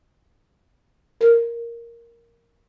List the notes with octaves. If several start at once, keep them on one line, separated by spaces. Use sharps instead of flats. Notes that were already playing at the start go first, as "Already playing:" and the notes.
A#4